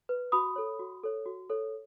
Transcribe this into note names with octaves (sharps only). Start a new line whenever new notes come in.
B4
F#4 B5 D#6
A4 C#5
F#4
A4 C#5
F#4
A4 C#5